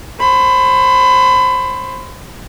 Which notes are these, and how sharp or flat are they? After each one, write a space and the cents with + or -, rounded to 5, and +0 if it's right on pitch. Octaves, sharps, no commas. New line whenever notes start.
C5 +25 B5 +30